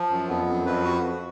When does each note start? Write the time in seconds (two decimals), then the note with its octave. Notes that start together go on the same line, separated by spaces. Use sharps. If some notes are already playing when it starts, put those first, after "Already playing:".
Already playing: F3
0.10 F#2
0.28 F2 B3
0.47 F#2
0.66 F2 B4
0.85 F#4